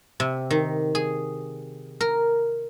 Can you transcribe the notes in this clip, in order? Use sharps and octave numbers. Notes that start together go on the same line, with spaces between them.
C3
D#3
G#4
A#4